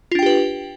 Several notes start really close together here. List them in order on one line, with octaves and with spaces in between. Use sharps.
F4 D4 G5 G4 B4